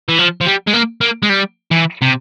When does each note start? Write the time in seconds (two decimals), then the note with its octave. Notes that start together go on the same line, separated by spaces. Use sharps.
0.09 E3
0.19 F3
0.41 F3
0.46 G3
0.67 G#3
0.74 A#3
1.01 A#3
1.23 G#3
1.30 G3
1.71 E3
2.02 C3